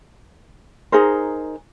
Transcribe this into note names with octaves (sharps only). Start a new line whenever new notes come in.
D#4 G#4 A#4 C5